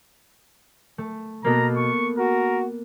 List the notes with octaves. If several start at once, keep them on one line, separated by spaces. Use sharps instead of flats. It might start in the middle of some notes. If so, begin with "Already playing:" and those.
A3
B2 A#3 B3 A4 A#5
C#6
F#4 A#4